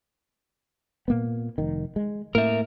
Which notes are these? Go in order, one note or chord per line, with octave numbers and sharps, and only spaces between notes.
A#2 A#3 B3
F1 D#3
G#3
A2 A#3 A#4 E5